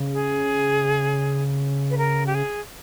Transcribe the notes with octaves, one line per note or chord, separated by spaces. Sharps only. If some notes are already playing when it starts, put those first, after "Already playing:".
Already playing: C#3
G#4
B4
A#4
G4
G#4